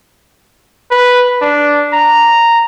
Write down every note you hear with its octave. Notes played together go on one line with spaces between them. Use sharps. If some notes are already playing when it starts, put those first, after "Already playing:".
B4
D4
A#5